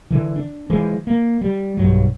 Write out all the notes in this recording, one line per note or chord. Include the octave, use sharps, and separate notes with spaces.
D3 E3
D4
E3 F3 G#3
A#3
G3
B1 G2 F#3